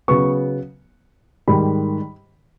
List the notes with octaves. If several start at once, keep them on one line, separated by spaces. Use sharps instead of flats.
C#3 F#3 B3 C#6
G#2 D#3 G3 B5